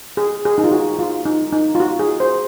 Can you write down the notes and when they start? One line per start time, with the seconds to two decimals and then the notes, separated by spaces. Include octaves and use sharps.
0.17 G#4
0.45 G#4
0.58 D#4
0.64 F4
0.72 F#4
0.99 F4
1.25 D#4
1.53 D#4
1.75 F4
1.80 F#4
1.99 G#4
2.20 C5